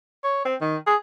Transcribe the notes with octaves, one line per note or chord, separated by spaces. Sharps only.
C#5
C4
D#3
G#4